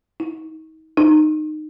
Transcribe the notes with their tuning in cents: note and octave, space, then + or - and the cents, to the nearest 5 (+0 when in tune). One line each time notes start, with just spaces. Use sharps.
D#4 +35
D#4 -20